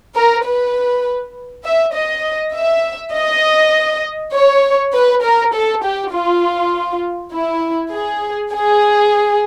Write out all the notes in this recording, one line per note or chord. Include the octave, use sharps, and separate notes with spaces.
A#4
B4
E5
D#5
E5
D#5
C#5
B4
A#4
A4
G4
F4
E4
G#4
G#4